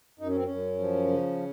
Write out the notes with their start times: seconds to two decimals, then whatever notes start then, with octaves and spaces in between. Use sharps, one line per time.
0.19 F#2 D#4
0.28 C#4
0.35 C4
0.44 F#2 C#4
0.78 F3
1.08 C#3